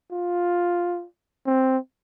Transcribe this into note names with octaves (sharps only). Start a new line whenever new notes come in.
F4
C4